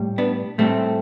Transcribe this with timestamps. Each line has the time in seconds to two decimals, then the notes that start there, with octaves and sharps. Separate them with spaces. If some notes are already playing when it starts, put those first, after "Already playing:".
Already playing: A2 G3
0.18 B3 D4
0.58 A2 G3 A3 C4